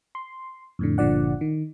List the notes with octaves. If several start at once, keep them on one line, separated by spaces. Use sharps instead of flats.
C6
F2 A2 D3
G1 A#2 D3 F3 D5 F#5
D#3